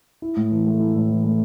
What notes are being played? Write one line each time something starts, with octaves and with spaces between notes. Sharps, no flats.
E4
A2
E3
A3
E4
A2
E3
A3